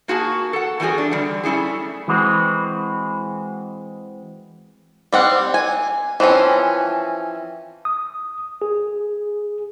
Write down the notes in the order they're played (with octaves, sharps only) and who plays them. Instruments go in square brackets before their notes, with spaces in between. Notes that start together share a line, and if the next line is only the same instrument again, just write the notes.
[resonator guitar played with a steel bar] A#3 F#4 G#4 A5
A4 F#5
E3 G3 B3 F#4 G#4
D4
D3 G3
G3 A3 C#4 E4 G#4
[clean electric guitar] E3 G#3 C4 F#4 B4
[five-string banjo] G3 C4 F#5
G#5
E3 F3 C4 C#4
[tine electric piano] D#6
G#4